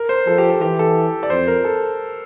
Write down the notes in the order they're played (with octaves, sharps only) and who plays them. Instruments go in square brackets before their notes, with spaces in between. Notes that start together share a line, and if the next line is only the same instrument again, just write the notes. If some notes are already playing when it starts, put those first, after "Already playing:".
Already playing: [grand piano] A#4
C5
[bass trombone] F3 [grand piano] A4
[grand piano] G4
A4
[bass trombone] E3 [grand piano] G4
[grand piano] A4
D5
[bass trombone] F2 [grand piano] C5
[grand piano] A#4
A4